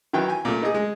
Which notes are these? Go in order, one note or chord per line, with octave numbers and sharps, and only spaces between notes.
D#3 E3 F#3 G5
G5 G#5
A#2 A3
D#4 G#4
G#3